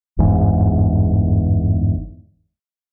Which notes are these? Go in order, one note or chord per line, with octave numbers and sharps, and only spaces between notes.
G1 E2 G#2